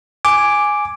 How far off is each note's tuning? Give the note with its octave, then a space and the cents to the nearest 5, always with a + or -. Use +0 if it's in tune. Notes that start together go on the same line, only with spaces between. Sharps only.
G#5 +0 D6 +0